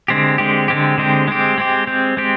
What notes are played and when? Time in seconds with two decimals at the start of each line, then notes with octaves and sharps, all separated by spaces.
0.08 D3 G#3 C4 G4
0.38 D3 G#3 C4 G4
0.68 D3 G#3 C4 G4
0.98 D3 G#3 C4 G4
1.28 G#3 C4 G4
1.58 G#3 C4 G4
1.87 G#3 C4 G4
2.17 G#3 C4 G4